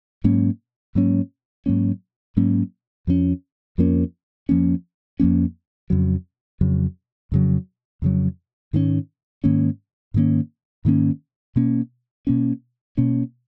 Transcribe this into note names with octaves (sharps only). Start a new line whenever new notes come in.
G#2 F#3 A#3 C#4
G#2 F#3 A#3 C#4
G#2 F#3 A#3 C#4
G#2 F#3 A#3 C#4
F2 F3 A#3 C#4
F2 F3 A#3 C#4
F2 F3 A#3 C#4
F2 F3 A#3 C#4
F2 C#3 F#3
F2 C#3 F#3
F2 C#3 F#3
F2 C#3 F#3
G#2 D#3 A#3 C#4
G#2 D#3 A#3 C#4
G#2 D#3 A#3 C#4
G#2 D#3 A#3 C#4
B2 A#3 C#4
B2 A#3 C#4
B2 A#3 C#4